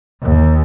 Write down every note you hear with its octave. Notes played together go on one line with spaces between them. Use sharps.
D#2